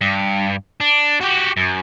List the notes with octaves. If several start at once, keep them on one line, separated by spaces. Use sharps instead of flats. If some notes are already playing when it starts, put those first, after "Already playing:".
G2
D4
F#4 G4
F#2